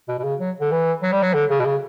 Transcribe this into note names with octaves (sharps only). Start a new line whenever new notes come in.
B2
B2
C#3
F#3
D3
E3
F#3
G3
F#3
D3
C#3
B2
C#3